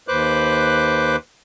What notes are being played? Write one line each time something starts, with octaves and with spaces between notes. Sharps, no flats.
D#2 B4 C5 D6 F#6